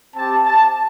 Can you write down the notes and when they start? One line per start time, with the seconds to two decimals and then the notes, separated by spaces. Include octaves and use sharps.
0.15 C4 G4 A5
0.45 A5